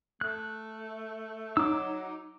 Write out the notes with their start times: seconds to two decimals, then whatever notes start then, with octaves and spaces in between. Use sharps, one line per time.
0.21 A3 F#6
1.57 F#3 D#4 D6 E6